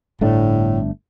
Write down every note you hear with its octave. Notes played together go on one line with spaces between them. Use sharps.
G1 A2 A3 D4